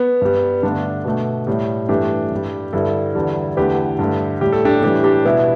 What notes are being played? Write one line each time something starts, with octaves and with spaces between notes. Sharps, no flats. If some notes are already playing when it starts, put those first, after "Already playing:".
Already playing: B3
G2 G3
G2 D3 A3 D4
B2 A3
A2 G3
G2 E3 A3 D4 G4
G2 G3
G2 D3 G3 E4 A4
E2 D3 G3
E2 D3 A3 G4 B4
G2 D3 A3
A2 G3 G4
A4
D4 G4
A2 E3 G3 D4 G4
D4 G4
B2 G3 B3 E4